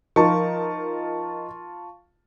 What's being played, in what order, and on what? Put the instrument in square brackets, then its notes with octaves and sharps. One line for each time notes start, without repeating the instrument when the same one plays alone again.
[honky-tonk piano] F3 D#4 A#4 [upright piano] F4 A5 C#6